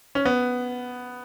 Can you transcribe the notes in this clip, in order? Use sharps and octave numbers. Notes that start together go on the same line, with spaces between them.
C#4
B3